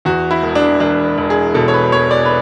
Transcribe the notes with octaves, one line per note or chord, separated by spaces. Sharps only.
E2 F#4
E4
E1
D4
E1 D4
E1
G#4
B2 A4
C#5
B4
E1 C#5
D5
B4